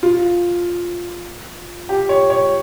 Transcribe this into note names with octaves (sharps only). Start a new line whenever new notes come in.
F4
G4
C#5
C#5